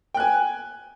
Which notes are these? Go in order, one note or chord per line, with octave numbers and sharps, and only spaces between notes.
G5 G#5 F#6